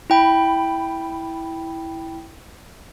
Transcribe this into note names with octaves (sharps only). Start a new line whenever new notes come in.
E4 G5 B5